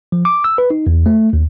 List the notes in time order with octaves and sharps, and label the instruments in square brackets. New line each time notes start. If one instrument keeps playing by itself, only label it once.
[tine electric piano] F3
D6
E6
B4
D#4
E2
A3
D#2